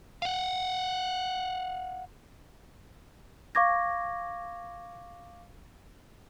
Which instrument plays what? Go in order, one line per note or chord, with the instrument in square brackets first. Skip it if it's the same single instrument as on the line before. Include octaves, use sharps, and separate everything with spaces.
[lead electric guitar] F5 F#5
[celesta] F5 C#6 D6 G#6 A#6